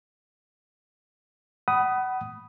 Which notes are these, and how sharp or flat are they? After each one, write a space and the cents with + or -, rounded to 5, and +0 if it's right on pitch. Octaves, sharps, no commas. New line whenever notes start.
F#5 +30 B5 +0 D#6 +0